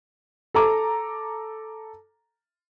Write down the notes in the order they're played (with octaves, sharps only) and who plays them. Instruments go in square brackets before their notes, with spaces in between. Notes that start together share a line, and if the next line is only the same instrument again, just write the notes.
[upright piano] A4 A#5 D6